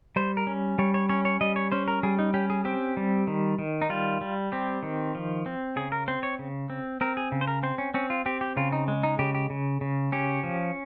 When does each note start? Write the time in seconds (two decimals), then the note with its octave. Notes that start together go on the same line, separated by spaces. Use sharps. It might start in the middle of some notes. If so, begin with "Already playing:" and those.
0.16 G3 C5
0.37 A#4
0.47 C#4
0.79 G3 C#5
0.94 C#5
1.09 C#4 C#5
1.25 C#5
1.41 G3 D#5
1.56 C#5
1.72 C#4 C5
1.88 A#4
2.03 G3 G#4
2.19 D#4
2.34 C#4 G4
2.50 G#4
2.65 C4 G4
2.97 G3
3.27 D#3
3.59 D#3
3.82 D#4
3.90 G3 F4
4.21 G3
4.52 C4 G4
4.83 D#3
5.15 F3
5.46 C4
5.76 C#3 G#4
5.92 A#4
6.08 C4 C5
6.23 C#5
6.39 C#3
6.70 C4
7.01 C4 A#4
7.17 G#4
7.32 C#3
7.41 C5
7.47 A#4
7.63 C4 C5
7.78 C#4
7.94 C4 C#4
8.10 F4
8.26 C4 G4
8.41 G4
8.57 C#3 F4
8.72 D#4
8.88 G#3
9.03 D#4
9.19 C#3 G4
9.35 G4
9.50 C#3
9.81 C#3
10.12 C#4 G4
10.43 F3